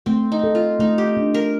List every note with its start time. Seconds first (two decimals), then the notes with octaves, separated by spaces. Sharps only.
0.06 A3 C4
0.32 D#4
0.44 A4
0.55 F4
0.79 A3 D#4
0.98 G4
1.17 D4
1.34 A#4